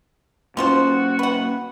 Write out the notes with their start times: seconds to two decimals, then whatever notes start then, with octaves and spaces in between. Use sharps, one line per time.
0.57 F3 A#3 C#4 F4 F#4 C5
1.19 B4 F#5